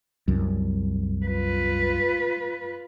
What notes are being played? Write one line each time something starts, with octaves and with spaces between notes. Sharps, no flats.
C2 F#2
F4 B4